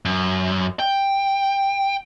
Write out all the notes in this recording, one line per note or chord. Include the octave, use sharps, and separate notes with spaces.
F#2
G5